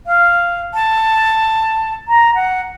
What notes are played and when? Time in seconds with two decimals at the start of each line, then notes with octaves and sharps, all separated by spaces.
0.07 F5
0.74 A5
2.08 A#5
2.35 F#5